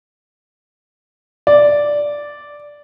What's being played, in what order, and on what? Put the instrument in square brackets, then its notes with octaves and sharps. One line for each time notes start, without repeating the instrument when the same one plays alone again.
[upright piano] D5